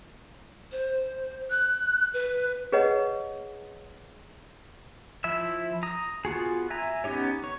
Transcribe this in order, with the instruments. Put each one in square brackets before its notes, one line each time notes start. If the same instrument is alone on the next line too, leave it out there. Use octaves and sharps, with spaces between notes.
[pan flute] C5
F#6
B4
[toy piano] G#4 B4 C#5 D#5 F#5
[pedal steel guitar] F3 E4 E5 E6
A#5 D#6
B3 F4 F#4 G#4
E5 G#5 A#5
B3 C#4 D#4 G4 C#5
C#5